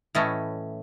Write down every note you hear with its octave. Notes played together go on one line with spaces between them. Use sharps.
A2 E3 A3 C#4 D#5